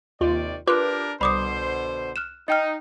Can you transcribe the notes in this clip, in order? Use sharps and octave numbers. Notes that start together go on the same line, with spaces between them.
D#2 C3 D#3 F4 D5
D4 F4 G4 A#4 B4 D6 F#6
C2 B2 D3 C5 B5 D6 D#6
F6 F#6 E7
D#4 D#5 G5 F6